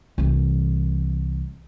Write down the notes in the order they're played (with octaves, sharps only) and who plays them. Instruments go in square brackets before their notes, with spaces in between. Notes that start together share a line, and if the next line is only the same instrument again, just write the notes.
[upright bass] C2 E3